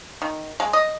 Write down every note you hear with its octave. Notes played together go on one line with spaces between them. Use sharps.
D#3
G#3
D#5